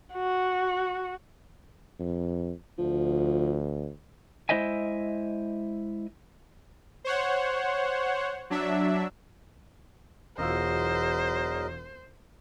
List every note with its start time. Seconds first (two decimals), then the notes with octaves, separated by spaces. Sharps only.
0.14 F#4
2.00 F2
2.78 D2 F3
4.49 G#3 E4 C5 D#5 E5 G#5
7.04 C5 C#5 F#5
8.50 F#3 D4 E5
10.38 E1 E2 F#3 F4 A#4 C5 D#5 E6